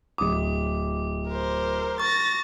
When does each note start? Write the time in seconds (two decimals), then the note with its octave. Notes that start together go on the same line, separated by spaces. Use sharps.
0.18 D1 D6 D#6
1.29 A#4 C5
2.00 C#6 A6 A#6